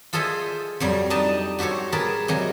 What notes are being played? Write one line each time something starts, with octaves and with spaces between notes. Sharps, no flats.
F4 G#4 A4 C5 D#5 E5
F2 F#3 G3
D4 D#4 D#5 G5 A5
F#4 G4 A4 C5 C#5
G#4 A#4 B4 A5
C3 F#3 G#3